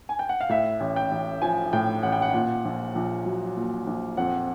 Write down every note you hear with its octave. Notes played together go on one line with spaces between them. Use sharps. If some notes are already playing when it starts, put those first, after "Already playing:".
G#5
G5
F#5
F5
A2 E5
A1
G5
A1
F3 G#5
A2 G5
A1 F#5
G5
F#5
A#2
A#1
A#1
F#3
A#2
A#1
F2 F#5